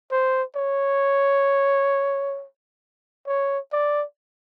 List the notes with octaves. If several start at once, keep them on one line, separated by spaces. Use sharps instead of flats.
C5
C#5
C#5
D5